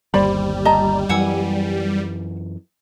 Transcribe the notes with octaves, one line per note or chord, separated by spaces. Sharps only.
G1 D#2 G3 C5 D5 B5
D#5 A5 A#5
F#2 E3 F#5 G#5 E6